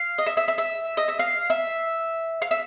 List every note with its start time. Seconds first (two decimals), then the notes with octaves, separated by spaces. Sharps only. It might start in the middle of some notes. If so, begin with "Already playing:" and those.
Already playing: F5
0.18 D#5
0.26 E5
0.37 E5
0.48 E5
0.58 E5
0.97 D#5
1.08 E5
1.19 F5
1.50 E5
2.42 F5
2.51 E5